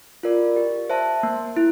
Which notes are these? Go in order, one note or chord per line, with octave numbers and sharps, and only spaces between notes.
F4 A#4 D5
G4
C5 E5 A5
A#3
E4